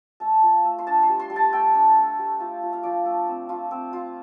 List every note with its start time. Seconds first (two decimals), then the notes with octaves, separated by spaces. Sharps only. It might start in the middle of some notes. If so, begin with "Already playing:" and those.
0.20 A3 A5
0.42 F4
0.65 A3
0.78 C6
0.87 D4 A5
1.02 C6
1.09 G3
1.20 C6
1.30 G3
1.36 A5
1.52 A3 G5
1.75 D4
1.96 A3
2.18 G3
2.40 F4
2.62 F4
2.73 F5
2.83 F3 D5
3.05 A3
3.28 C4
3.49 F4
3.71 C4
3.93 F4